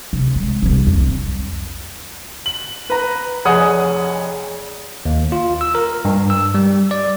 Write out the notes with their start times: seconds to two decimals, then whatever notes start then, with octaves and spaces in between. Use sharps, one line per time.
0.13 C3
0.36 G#3
0.62 D#1 C2
0.87 F2
1.00 F#3
2.46 F#7
2.90 B4 A#5
3.45 F1 G#4 C#5 F#5 D#6
5.05 D#2
5.32 F4
5.61 E6
5.75 A#4
6.05 G2
6.30 E6
6.55 G3
6.91 D5